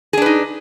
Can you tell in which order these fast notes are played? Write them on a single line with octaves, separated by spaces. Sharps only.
G#4 D4 B4 D#4